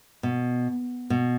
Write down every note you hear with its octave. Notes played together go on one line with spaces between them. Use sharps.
B2
B2